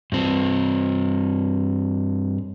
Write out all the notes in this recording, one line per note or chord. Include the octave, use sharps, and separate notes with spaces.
G2 C4